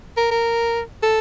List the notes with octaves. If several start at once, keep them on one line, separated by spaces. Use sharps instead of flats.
A#4
A#4
A4